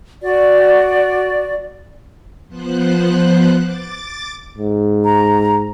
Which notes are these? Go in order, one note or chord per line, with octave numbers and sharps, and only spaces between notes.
F#4 D5
F3 B3 C5 F#6
D6 A6
G#2
A#5